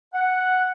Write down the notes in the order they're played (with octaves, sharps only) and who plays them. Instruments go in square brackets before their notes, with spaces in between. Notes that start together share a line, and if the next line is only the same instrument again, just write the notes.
[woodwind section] F#5